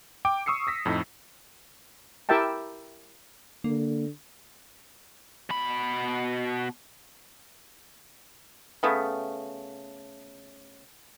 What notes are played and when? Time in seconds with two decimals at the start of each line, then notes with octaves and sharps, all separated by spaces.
0.25 G5 D6
0.46 C#6 D#6 E6 C7 C#7
0.67 D#6 A#6 B6
0.85 F2 A2 D#4
2.29 E4 G4 A#4 E5 G5 A5
3.64 D3 A#3
5.50 B2 B5
8.83 C#3 A3 B3